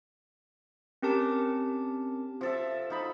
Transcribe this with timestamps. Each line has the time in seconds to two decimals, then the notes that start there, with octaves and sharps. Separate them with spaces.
1.02 C4 C#4 G4 A#4 A5 D6
2.41 F3 A4 E5
2.90 F3 D#4 B5